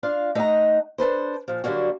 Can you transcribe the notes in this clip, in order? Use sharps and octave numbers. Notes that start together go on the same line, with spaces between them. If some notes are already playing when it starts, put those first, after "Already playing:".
D4 F4 F5
A3 D#4 D#5 F5 F#5 A#5
D4 A4 B4 C5
A#2 F3
D3 F#3 G3 A#3 F#4